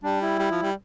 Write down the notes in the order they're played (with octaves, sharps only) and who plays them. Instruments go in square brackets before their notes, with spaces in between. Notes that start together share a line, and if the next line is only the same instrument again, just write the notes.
[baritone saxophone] G3 [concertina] D4
[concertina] E4
[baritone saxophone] G3
F3
G3